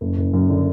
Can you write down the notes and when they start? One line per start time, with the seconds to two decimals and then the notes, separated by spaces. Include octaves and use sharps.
0.01 F#1
0.18 F#1
0.33 F#2
0.50 D3